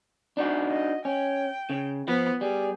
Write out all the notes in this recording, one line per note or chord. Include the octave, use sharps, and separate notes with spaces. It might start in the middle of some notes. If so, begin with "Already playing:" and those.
D4 D#4 F#4
D#5
C#4 G5
C#3
F3 B3
G3 G#4